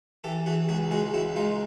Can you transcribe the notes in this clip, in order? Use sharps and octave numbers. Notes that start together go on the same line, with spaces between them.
E3 G4 A4
E3 F#4 G#4
C#2 F#4 G#4
G#3 F#4 G#4
C#2 E4 F#4
G#3 D#4 F4